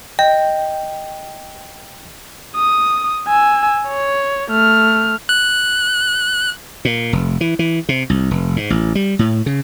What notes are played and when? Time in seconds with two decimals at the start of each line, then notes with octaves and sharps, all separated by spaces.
0.19 D#5 G5
2.56 D#6
3.27 G#5 E6
3.88 C#5
4.51 A3 F6
5.29 F#6
6.85 A#2
7.13 F1
7.41 E3
7.59 E3
7.89 C3
8.10 C2
8.31 F1
8.56 G#2
8.70 A1
8.95 G3
9.19 A2
9.46 C#3